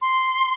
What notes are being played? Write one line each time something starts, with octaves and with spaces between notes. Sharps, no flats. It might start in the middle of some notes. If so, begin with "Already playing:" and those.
C6